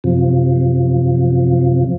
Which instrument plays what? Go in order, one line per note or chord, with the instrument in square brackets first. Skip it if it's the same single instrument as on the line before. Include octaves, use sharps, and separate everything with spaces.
[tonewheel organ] F#2 C3 F3